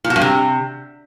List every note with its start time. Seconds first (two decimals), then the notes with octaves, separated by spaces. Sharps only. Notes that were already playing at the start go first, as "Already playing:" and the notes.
0.04 A#2
0.10 B2
0.16 G2
0.21 C3